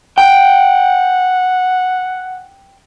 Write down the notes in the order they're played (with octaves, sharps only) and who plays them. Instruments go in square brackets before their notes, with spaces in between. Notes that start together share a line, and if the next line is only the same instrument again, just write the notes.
[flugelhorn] F#5 [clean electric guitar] G5